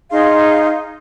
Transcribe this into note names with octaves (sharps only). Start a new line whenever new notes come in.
D#4 G#4 F5 C6